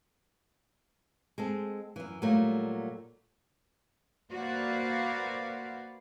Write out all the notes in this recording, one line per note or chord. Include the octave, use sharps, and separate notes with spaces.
G#3 C4 A4
F#2 E3
A#2 F#3 G3 A3 A#3
A#3 F#4 B4 C5 D5 F5